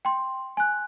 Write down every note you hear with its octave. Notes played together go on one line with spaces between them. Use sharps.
G5 C6
G#5 F#6